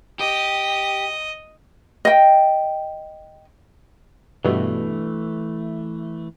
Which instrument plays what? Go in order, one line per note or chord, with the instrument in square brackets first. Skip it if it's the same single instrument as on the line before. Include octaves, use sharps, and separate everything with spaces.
[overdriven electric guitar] G4 [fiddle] D#5
[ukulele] D#5 G5
[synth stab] G2 B2 [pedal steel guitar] E3 A3